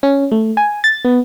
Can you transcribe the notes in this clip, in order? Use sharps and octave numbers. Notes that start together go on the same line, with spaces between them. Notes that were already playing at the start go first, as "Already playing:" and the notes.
C#4
A3
G#5
A6
B3